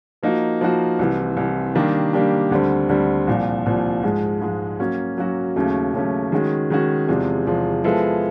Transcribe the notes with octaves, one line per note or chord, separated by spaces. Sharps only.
F3 A#3 D#4 F#4
F3 A#3 D#4 F#4
C2 C3 E3
C2 C3 E3
D#3 G3 A#3 D4 G4
D#3 G3 A#3 D4 G4
D2 D3 G3 C4
D2 D3 G3 C4
C2 A#2 F3
C2 A#2 F3
G#2 F3 G#3
G#2 F3 G#3
F#3 A#3 C#4 F#4
F#3 A#3 C#4 F#4
D#2 C#3 F#3 A3 C#4
D#2 C#3 F#3 A3 C#4
D#3 G#3 C#4 F#4
D#3 G#3 C#4 F#4
E2 C3 F3 G#3
E2 C3 F3 G#3
F3 G#3 B3 E4 A4